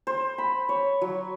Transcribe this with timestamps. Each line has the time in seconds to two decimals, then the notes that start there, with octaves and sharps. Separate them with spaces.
0.07 C5
0.38 B5
0.69 C#5
1.01 F#3